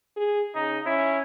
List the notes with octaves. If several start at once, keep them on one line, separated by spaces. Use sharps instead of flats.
G#4
C#3 D#4
C#4 E4